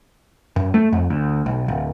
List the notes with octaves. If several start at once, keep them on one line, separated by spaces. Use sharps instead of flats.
F#2
A3
F2
D2
B1
D1